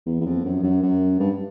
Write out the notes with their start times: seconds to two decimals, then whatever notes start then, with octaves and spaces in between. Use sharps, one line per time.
0.06 E2
0.21 E2
0.26 F2
0.44 F#2
0.63 F#2
0.83 F#2
1.20 G2